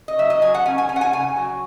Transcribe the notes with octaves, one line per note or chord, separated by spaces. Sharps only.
D#5
F#3 E5
D#5
F#3 G#5
F#5
C#4 G#5
G#5
C#4 G#5
F#5
G#5
C#3 G#5
F#3